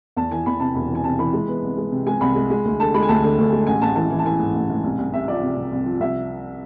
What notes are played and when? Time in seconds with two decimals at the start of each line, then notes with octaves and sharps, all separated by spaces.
0.17 E2 A5
0.31 E3 G#5
0.46 E2 B5
0.60 C3 A5
0.75 E1 B5
0.90 E3 G#5
1.04 C3 A5
1.19 E3 B5
1.33 G#3
1.48 B3
1.63 C2
1.77 G#3
1.92 C3
2.07 G#3 G#5
2.21 C2 B5
2.35 G#3
2.50 G#3
2.65 D2
2.80 D3 A5
2.94 G#3 B5
3.03 G#5
3.09 D2 A5
3.24 D3
3.38 D2
3.52 G#3
3.67 A1 G#5
3.82 A1 A5
3.96 E3 A5
4.10 E3
4.19 A5
4.25 E3 G#5
4.40 G#2
4.55 A1
4.70 G#2
4.84 C2
4.98 C2
5.14 C3 E5
5.28 F3 D5
5.43 C3
5.57 C2
5.72 C2
5.86 F3
6.00 C2 E5